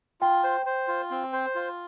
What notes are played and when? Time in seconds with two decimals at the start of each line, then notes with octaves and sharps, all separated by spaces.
0.21 F4 G5
0.44 C5
0.66 C5
0.88 F4
1.10 C4
1.33 C5
1.55 F4